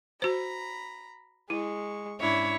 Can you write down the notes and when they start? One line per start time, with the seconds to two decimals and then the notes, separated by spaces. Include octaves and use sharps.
0.22 F#4 C5 A#5 B5
1.50 G#3 E4 C#6
2.20 G#2 C#4 D4 E4 C#5